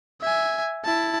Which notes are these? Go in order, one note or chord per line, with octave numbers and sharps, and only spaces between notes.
E5 G#5
E4 A5